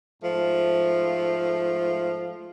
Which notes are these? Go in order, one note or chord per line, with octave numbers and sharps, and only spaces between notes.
G#2 F3 A3